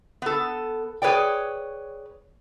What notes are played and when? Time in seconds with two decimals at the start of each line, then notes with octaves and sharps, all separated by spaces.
0.22 B3 A4
1.02 G#4 B4 C#5 D5 G5